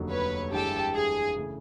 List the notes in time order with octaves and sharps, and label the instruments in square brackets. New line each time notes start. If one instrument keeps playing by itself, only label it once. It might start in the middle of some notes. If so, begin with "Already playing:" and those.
Already playing: [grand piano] F1 D#2 D3 F#3
[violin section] B4 C#5
[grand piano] G1 G2 E3 G#3 [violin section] G4 A4
[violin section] G#4
[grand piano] C#3 E3 A3